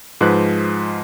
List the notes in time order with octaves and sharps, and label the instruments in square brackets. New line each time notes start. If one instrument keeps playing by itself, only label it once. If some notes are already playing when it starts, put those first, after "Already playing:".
[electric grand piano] G#2 F3 G#3 B4 F#6